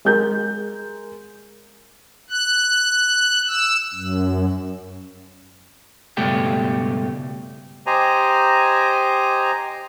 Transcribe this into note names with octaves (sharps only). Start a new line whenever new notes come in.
G#3 G#4 A#4 G6
F#6
E6
F#2
C#2 G2 B2 A3 G4
G4 C5 D#5 G#5 A#5